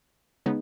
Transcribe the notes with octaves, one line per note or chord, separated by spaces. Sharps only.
C#3 G#3 B3 D#4